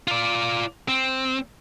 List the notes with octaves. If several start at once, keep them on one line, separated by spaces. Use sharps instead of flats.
F4 D5
C4